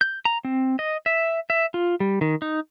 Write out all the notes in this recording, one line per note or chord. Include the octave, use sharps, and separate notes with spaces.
G6
A#5
C4
D#5
E5
E5
F4
G3
D#3
D#4